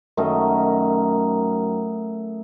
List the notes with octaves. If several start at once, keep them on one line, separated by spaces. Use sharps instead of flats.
F#2 D#3 A3 D#4